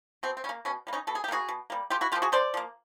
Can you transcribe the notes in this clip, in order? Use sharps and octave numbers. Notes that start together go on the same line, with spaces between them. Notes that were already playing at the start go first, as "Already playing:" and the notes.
B2 C4
C4
G3 C#4
A#3
B2 C#4
G3 A#3
C#4 D#4
B2 A4
G#4
G4
G3 A#3 F#4 G#4
B2
G3 A#3
D3 F4 G4
E4 F#4
F3 A#3 F4 G4
F#4 G#4
D3 C5 D5
F3 A#3